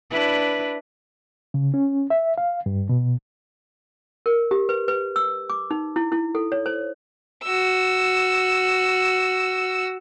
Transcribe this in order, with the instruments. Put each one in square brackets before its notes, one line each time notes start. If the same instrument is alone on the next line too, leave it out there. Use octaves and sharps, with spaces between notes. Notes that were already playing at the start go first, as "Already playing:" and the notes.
[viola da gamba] D4 E4 B4
[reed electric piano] C#3
C#4
E5
F5
G2
B2
[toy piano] A#4
G4
B4
B4
E6
D6
D#4
E4
E4
A4
C#5
C5
[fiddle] F#4 E6